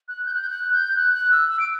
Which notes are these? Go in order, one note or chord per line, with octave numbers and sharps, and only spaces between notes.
F#6
G6
F#6
G6
F#6
G6
F#6
F#6
E6
E6
D7